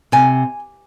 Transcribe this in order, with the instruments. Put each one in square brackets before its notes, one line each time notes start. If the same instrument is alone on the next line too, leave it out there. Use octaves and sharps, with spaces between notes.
[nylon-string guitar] C3 G#5